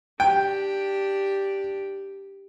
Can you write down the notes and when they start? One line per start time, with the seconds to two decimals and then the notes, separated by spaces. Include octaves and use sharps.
0.20 D4 G4 G5